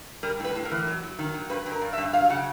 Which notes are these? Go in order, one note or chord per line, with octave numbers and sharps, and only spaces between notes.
G3 A#4
A2 B4
A2
A#4
E3
F#3
F#3
D#3
F#3
G2 B4
G2
A#4
G2
E5
G2
F#3 F5
C#3 F#5